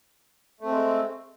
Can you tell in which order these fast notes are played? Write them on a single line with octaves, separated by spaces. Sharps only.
A3 C4 G#3